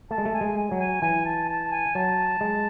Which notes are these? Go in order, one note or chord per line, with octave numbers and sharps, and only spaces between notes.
A3 A5
G#3
A3
G#5
G#3
G#5
F#3
G#5
E3 G#5
A5
A5
G#5
F#3 A5
G#3